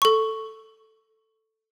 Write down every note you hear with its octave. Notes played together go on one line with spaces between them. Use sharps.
A4 C#6